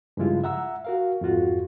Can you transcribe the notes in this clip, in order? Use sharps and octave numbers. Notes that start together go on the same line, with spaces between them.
G2 C#3 F3 G#3 E4 F4
E5 F#5 A#5 E6
F#4 A#4 F5
F2 G#2 F4 F#4